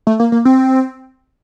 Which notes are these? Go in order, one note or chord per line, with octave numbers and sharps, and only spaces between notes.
A3
A#3
A#3
C4